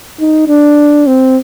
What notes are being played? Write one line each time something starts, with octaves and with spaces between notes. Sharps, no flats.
D#4
D4
C4